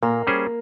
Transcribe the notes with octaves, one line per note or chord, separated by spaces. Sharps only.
A#2 A#3
G3 C#4 G#4 C5